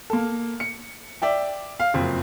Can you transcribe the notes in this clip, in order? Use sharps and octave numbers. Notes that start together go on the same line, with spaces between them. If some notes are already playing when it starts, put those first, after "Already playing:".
A#3 A4
C#7
D5 E5 G5
F5
F#1 F2